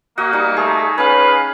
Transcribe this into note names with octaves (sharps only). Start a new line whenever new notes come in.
A#3 F#4 D#5 F#5
G3 D#4
A3 G#4
C#4 B4 F5